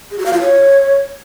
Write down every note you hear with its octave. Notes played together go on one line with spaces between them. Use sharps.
G#4
F#4
F5
F4
C#5